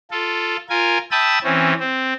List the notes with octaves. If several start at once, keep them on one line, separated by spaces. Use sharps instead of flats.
F4 A4
F4 A#4 G#5
E5 G5 A5 B5 D#6 E6
E3 C4 C#4
C4